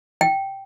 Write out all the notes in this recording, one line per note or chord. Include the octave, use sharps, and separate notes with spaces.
G5